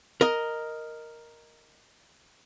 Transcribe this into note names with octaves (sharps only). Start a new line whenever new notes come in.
A#4 D#5